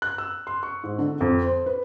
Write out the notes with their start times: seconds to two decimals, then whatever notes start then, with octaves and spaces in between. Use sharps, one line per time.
0.02 F#6
0.18 E6
0.47 C6
0.63 C#6
0.84 G#2
0.99 D3
1.21 F2
1.43 C5
1.66 B4